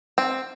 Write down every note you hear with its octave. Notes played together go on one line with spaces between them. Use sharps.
C4